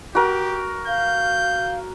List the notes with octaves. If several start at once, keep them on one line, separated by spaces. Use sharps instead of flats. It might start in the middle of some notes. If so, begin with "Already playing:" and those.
F#4 G4 A#4
F5 G6